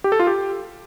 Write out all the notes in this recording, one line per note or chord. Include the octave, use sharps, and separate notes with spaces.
G4
A4
F4
G4